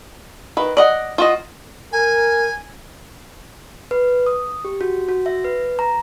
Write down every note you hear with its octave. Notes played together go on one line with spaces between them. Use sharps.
D#3 B4
D5 D#5 F#5
F4 F#4 D#5
A#4 G#5
B4
D#6
G4
F#4
F#4
E5
B4
A#5